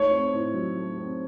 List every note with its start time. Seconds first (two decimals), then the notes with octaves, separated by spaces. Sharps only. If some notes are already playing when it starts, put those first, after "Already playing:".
Already playing: A3 D#4 C#5
0.11 C4
0.33 A2
0.54 F#3
0.76 A3
0.98 C4